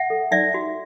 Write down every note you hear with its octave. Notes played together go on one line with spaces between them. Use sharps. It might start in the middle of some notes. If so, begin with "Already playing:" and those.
Already playing: E5 F#5
A4
D#4 D5 E5
F#4